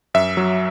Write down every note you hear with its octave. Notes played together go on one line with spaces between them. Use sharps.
F#2 E5
F#3